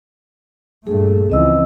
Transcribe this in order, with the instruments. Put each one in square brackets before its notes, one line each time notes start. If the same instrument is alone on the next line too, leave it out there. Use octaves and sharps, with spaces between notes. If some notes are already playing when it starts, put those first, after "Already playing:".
[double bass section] G2 A#2 A3 [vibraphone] G#4 A4
[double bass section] C#2 E3 F3 [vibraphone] C4 D#5 E6